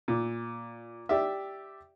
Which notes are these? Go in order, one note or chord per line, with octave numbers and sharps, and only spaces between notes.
A#2
G4 D5 E5